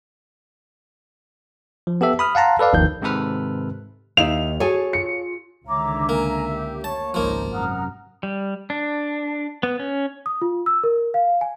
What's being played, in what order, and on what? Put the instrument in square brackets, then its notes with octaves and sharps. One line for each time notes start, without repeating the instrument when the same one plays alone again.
[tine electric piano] F3
B3 G4 A4 E5
B5 D#6 F6
F5 F#5 A5 A#5 C6
A4 B4 D5 F5
G1 D#2 D#3 F3 G6
G#2 C3 D#3 A4 B4 F6
[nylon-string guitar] D#2 [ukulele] D#4 E5 F5 [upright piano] F7
[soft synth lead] F#4 [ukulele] G#4 G#5 [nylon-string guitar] A4 C#5
[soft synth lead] F4 [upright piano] C#7
[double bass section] C#2 D3 D#3 [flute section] C#5 A#5 D6 [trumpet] E5
[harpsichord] A#3 [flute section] G#5 A#5
[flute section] G4
[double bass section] A#3 [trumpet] C#5 [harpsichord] A5
[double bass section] G#1 C#2 [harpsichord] F3 A#3 [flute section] D#4
[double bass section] F#2 C3 [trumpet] F#5 [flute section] A#5 D#6 F6
[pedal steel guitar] G3
D4
B3
C#4
[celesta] D#6
F4
E6
A#4
F5
G#5